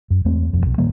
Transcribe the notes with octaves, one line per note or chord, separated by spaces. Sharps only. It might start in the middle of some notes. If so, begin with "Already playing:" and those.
F#2
E2 G#3 A3 C4
E1 F2
B1
A2 D#3 G3 A#3